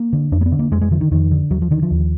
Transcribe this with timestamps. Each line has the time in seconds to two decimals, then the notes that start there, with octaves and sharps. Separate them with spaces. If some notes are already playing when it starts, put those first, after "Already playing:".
Already playing: A#3
0.13 D3
0.32 F2 D4
0.41 A#3
0.46 B3
0.52 D3
0.59 A#3
0.71 F2 G#3
0.81 G#3
0.91 D3 F3
1.01 D#3
1.12 F2 D#3
1.31 D3
1.50 D#2 F#3
1.62 F3
1.71 D3 D#3
1.83 F3
1.91 D#2